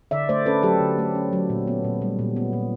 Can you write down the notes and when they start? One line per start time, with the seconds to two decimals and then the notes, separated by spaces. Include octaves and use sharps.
0.11 D3 D5 E5
0.29 A3 C5 D5
0.46 C#4 A4 B4
0.63 F#3 G4 A4
0.80 D3
0.99 A3
1.15 C#4
1.33 F#3
1.50 A#2
1.67 B3
1.84 A#2
2.02 G3
2.19 A#2
2.36 B3
2.53 A#2